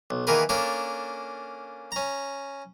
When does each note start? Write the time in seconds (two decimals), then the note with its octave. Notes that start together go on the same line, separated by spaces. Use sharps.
0.10 B1
0.27 D#3 E3 A#3 G#4 A#4 B4
0.49 A#3 C#4 D4 A4 A#4
1.92 C#4 A#5